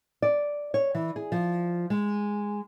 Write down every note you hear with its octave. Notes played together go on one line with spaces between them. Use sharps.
D5
C#5
E3
G#4
F3
G#3